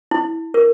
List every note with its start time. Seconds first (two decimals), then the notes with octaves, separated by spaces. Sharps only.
0.11 E4
0.54 A#4